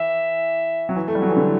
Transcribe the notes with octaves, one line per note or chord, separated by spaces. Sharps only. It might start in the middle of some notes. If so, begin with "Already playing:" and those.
Already playing: E3 E5
F#3
E3
A3
G3
F#3
E3
D3